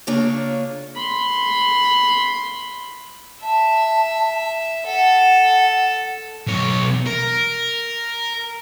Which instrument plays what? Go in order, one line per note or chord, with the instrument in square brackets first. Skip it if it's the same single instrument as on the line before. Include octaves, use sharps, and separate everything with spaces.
[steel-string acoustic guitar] C#3 A#3 D4 F4 C#5
[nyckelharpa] B5 C6
[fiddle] E5 [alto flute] A5
[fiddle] A4 [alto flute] F#5
[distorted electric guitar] B1 C#5
A#4